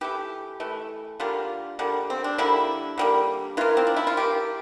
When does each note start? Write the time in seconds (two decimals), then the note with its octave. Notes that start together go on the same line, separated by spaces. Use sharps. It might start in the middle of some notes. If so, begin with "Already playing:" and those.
0.01 E3 A3 G4
0.60 E3 A3
1.20 D3 G3 A#3 F4
1.79 D3 G3 A#3
2.10 C4
2.24 D4
2.38 D3 G3 A#3 E4
2.98 D3 G3 A#3
3.57 E3 A#3 F4
3.77 C4
3.87 D4
3.96 E4
4.07 F4
4.17 E3 A#3 G4